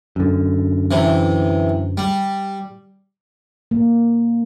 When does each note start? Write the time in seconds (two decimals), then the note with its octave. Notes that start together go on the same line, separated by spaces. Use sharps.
0.16 F#2 D3
0.91 C3 E3
1.98 G3
3.71 A#3